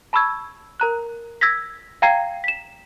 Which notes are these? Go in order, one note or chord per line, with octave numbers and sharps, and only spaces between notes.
A5 B5 C#6 E6 G#6
A#4 A#5 F#6
E6 G#6 A#6 B6
F5 G5 A#5 G#6 C7
B6 E7